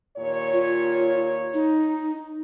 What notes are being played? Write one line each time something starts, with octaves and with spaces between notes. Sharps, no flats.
D#2 A#2 C#5
F4
D#4